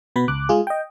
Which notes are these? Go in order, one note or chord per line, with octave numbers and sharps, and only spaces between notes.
B2 B3 B4 B5
C#2 D6 F#6
G#3 F4 G#4
D#5 G5